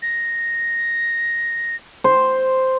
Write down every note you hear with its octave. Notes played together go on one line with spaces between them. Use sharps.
A#6
C5